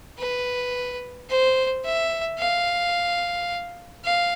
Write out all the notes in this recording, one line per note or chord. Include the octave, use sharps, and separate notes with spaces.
B4
C5
E5
F5
F5